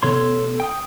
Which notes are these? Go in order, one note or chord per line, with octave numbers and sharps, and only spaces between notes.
A1 B2 B3 A4 C#5 C6
G5 D#6